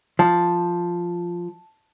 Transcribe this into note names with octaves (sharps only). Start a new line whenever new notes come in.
F3 A5